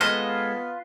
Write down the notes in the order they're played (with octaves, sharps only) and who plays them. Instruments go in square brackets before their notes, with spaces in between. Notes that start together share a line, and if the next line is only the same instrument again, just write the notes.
[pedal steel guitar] G#3 A4 [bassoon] B3 [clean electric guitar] F4 B4 F5 [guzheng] D#5